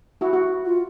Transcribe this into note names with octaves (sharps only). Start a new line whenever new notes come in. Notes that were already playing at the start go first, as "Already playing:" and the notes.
E4 F#4
F#4
F4